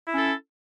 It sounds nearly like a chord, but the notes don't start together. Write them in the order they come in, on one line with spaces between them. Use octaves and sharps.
E4 C#4 A4